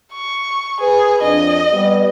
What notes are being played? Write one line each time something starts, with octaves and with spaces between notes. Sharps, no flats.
C#6
G#4 B4
F2 D4 D#5
G3 B3